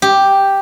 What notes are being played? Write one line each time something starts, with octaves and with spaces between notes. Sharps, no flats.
G4